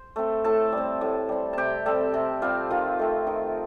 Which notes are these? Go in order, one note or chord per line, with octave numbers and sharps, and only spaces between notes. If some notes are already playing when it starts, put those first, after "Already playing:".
Already playing: C5
A3 C4
A2 A4 A5
G3 C4
A2
G3 C4
C3 G4 G5 A5
G3 C4 A4 A5
C3
G3 C4 F4 F5
D#3 F4 F5
A3 C4
D#3